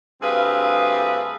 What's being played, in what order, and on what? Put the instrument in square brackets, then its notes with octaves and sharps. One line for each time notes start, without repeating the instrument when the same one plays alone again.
[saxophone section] D2 G2 C4 G#4 B4 F5